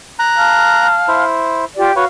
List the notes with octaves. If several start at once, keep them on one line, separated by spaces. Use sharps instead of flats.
A#5 F#6
F5 A5 F6
E4 C5
F4 G4 D5
F#4 B4 C#5 F5